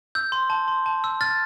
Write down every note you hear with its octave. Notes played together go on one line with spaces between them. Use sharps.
E6 G6
C6
A5
C6
A5
E6
F6 A6